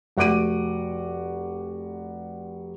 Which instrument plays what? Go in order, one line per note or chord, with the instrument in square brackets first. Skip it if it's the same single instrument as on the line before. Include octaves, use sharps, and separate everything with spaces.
[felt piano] F1 F#4 F#5 D6 D7 D#7